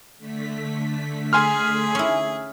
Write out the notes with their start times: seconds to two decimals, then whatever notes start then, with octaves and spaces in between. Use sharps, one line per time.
0.17 D3 A3 B6
1.33 G#4 G#5 C6 F6
1.95 C#4 E4